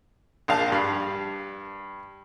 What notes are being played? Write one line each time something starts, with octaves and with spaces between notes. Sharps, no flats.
A#1 F5 A5
G2